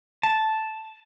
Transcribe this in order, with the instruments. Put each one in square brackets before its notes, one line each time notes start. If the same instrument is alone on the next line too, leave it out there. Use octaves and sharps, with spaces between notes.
[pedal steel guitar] A5